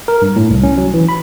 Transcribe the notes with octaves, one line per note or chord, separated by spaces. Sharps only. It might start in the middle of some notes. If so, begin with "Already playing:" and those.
A#4
G2
A2
C2
C#4
F#3
E3
B5